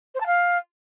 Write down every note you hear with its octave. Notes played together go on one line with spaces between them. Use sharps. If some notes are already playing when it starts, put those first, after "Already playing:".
C5
A5
F5